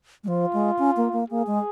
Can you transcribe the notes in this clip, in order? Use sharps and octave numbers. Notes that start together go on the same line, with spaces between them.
G#3
F3 F4
G#3
C#4
A#3
A#3
A#3 G#4
G#3